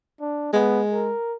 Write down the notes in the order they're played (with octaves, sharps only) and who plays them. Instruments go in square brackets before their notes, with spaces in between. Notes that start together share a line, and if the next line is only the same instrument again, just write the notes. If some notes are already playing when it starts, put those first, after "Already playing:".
[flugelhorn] D4
[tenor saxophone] G#3 [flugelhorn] B3
[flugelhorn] A#4